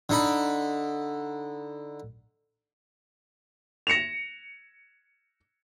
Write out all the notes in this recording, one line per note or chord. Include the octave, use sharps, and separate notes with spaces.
D3 D#4 B5
A#6 C#7 E7 F7